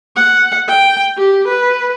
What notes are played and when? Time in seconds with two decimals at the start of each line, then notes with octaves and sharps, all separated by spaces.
0.16 F#5
0.68 G5
1.18 G4
1.48 B4